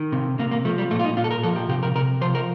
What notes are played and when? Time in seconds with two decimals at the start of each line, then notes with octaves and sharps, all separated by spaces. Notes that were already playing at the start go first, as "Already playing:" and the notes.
Already playing: D#3
0.12 C3
0.39 C3 A#3
0.51 A#3
0.65 F3 A3
0.78 G3
0.91 A#2 A3
0.99 F4
1.04 D#4
1.17 A#2 F4
1.24 A4
1.31 A#4
1.43 F3 A4
1.56 G4
1.69 C3 G4
1.83 A#4
1.95 C3 A#4
2.21 F3 C5
2.35 A#4